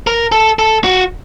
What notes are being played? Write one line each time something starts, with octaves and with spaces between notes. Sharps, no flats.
A#4
A4
A4
F#4